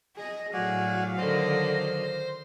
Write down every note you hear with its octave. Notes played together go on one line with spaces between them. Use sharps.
G#4 D#5
A2 F#3 F#4 G#4 D5 F5
D3 D#3 C5 D#5